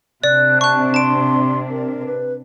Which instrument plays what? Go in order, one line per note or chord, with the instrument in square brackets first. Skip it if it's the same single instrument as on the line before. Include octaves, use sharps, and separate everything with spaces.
[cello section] C3 D4 [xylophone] D5 [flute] F#6
[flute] A5 [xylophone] C#6 F#6
[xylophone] A5 D7 [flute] C6
[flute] A#4
B4